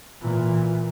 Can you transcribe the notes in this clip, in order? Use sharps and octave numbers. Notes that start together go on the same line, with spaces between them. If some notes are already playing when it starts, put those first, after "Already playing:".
A#2 E3